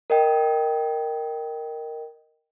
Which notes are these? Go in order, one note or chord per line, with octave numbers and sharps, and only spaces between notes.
A#4 D#5 G5